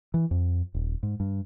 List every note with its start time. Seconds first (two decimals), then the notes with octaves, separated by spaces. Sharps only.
0.14 E3
0.31 F2
0.75 D#1
1.03 G#2
1.20 G2